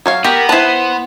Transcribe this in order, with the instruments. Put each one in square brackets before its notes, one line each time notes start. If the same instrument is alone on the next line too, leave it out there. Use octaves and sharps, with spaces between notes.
[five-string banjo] F#3 C#5 F5
[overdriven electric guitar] B3 [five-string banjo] G4 [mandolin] A#4
[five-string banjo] E4 A5 [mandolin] B4 C5